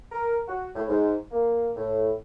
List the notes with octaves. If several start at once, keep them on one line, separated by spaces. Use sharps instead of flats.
A#4
F#4
A2
G#2
A#3
A2